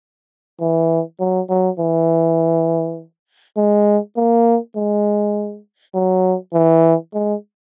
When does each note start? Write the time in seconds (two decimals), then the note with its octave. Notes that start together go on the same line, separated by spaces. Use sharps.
0.60 E3
1.20 F#3
1.49 F#3
1.79 E3
3.57 G#3
4.17 A#3
4.76 G#3
5.94 F#3
6.53 E3
7.14 G#3